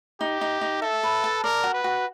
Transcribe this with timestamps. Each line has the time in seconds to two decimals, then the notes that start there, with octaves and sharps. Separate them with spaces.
0.21 D#4 G4
0.41 D#4
0.61 D#4
0.82 A4 E5
1.03 B4
1.24 A5
1.44 A#4 D5
1.64 F#4
1.74 B4
1.84 F#4